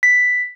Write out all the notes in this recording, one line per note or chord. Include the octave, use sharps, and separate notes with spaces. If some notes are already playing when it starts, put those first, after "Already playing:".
B6